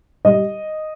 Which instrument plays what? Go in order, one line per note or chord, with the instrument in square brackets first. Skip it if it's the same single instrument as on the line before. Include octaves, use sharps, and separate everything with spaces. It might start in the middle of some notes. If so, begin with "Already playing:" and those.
[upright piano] G3 D#5